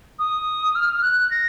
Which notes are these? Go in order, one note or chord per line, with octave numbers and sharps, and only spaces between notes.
D#6
F6
F#6
A#6